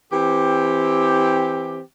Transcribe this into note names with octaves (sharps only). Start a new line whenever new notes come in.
E3 C4 G4